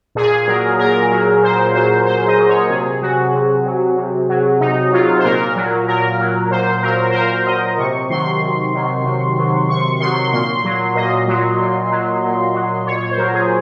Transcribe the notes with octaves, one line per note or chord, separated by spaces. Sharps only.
A#2 G#4
F#3 A#4
A#2 A#4
F#3
A#2 C5
F#3 C5
A#2 C5
D#5
F#3
C#5
C3 G#4
F#3 F#4
C3
F#3
C3
F#3
C3 D#4
F#3 F4
C5
A#2 A#4
F#3
A#2 A#4
F#3
A#2 C5
F#3 A#4
C5
A#2 A#4
F#3 D#5
C3 C#6
D#3 F#3 C6
C3
D#3 F#3
C3
D#3 F#3
C3 C#6
D#3 F#3 C6
A#2 C6
F#3
A#2 D#5
F#3
A#2
F#3
A#2
F#3
A#2 C#5
C#5
C5
F#3 A#4
G#4